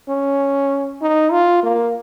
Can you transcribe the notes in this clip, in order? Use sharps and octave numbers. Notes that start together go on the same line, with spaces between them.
C#4
D#4
F4
A#3